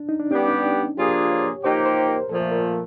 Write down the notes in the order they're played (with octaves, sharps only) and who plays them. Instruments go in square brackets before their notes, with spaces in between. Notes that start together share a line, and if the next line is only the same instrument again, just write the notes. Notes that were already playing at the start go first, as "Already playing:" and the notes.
Already playing: [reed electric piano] D4
D#4
D4
[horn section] G3 B3 D4 G4 [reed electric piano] C#4
[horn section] F3 A#3 D4 F4 G#4 [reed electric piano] G4
[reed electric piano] C#5
[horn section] F3 A#3 D#4 G4 [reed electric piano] C5
[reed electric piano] C5
A#4
[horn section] A#2 F3 A3 [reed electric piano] A4
[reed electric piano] A#4